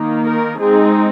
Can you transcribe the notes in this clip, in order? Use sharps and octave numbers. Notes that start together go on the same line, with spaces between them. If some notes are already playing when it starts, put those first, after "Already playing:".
Already playing: D#3 A#3 D#4
A#4
G#3 C4 D#4 G#4